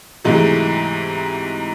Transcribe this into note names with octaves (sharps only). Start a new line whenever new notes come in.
G#2 C3 E3 F#3 G#3 A3